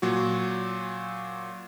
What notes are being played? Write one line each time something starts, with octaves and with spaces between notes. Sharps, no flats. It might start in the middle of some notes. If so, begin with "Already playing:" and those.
A#2 F#3 F#4